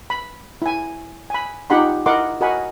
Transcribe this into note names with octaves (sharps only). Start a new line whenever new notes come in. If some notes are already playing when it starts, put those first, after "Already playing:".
B5
E4 G#5
G#5 B5
D#4 F4 G4 F#5 B5 C6
E4 A#4 D#5 F#5 C6 D6
F#4 A#4 D#5 F#5 G#5 B5